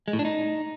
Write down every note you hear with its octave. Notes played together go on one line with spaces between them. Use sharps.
G#3
A2
D4
D#4